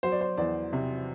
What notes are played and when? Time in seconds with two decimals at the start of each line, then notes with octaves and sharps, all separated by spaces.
0.03 F#3 C5
0.12 D5
0.21 C5
0.37 E2 D5
0.73 C3